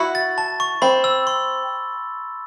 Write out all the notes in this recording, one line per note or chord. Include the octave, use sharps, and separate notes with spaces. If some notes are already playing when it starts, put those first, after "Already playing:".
Already playing: E4 F#4
A6
A5
C#6
C4 B5
E6
C6